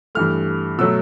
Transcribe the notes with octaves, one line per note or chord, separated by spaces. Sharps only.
G2 E3 A3 F6
B2 F#3 A3 E6